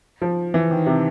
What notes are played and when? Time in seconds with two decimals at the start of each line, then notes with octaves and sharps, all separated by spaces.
0.22 F3
0.54 E3
0.71 D#3
0.86 C3